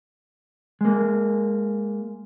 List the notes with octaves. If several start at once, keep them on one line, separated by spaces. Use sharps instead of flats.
G#3 A#3